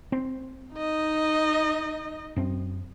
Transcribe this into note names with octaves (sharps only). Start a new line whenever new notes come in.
C4
D#4 D#5
F#2 C4